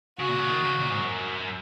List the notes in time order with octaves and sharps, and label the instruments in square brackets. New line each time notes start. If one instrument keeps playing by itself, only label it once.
[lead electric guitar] C#3 [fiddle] F#4
[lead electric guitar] A#2
C#3
D#3
C#3
A#2
G#2
F#2